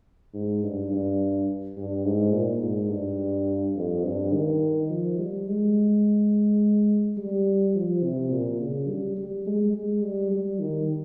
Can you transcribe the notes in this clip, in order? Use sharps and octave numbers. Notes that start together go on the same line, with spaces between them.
G#2
G2
G2
G2
G#2
A#2
G#2
G2
F2
G2
D#3
F3
G3
G#3
G3
F3
C3
A#2
C#3
G3
G3
G#3
G#3
G3
G3
D#3